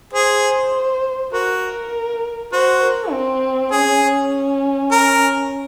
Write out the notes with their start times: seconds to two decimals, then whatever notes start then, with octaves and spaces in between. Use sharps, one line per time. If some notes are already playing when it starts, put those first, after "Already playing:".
0.13 G#4 C5
1.33 F#4 A#4
2.52 F#4 C5
2.82 A#4
3.12 C4
3.71 C#4 G#4
4.91 A#4